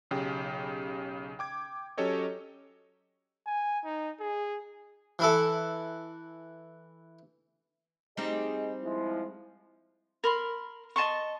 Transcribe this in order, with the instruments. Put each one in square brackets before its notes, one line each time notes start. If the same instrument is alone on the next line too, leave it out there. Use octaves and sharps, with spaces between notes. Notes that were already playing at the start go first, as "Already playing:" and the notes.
[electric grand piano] B1 C#3 G4 G5
G5 D6 G#6
F#3 C#4 G4 A4 C#5 D#5
[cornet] G#5
D#4
G#4
[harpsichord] E3 E4 A4
[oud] G3 C4 D#4 [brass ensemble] G#4 D#5
[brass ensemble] F3 G#3 E4
[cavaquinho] A#4 B5 C6
D#5 A5 C6 C#6